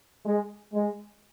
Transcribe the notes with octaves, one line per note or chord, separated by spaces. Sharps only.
G#3
G#3